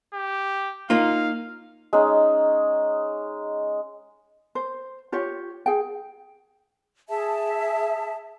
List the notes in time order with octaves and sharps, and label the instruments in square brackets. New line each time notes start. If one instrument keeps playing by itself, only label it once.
[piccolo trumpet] G4
[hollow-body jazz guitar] A#3 D#4 F4 [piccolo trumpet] F5
[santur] G#3 C#4 D#4
[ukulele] C5
F4 G4 C#5
G#4 G5
[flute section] G#4 E5 A5